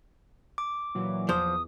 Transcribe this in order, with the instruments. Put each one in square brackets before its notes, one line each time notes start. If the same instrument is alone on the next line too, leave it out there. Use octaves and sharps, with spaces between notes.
[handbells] D6
[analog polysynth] A#2 E3 F#3
[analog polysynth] E2 [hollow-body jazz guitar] F3 C5 [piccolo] D#6